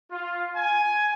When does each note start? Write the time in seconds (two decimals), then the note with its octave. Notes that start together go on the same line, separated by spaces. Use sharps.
0.11 F4
0.56 G#5